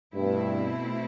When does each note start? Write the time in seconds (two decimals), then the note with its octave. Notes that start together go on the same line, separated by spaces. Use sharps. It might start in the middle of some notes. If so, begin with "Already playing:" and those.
0.14 G2 B2 A3 C4 E4